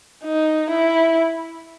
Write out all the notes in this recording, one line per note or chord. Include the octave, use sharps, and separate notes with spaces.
D#4
E4